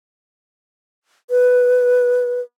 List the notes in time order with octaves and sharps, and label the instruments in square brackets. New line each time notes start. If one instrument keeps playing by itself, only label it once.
[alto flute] B4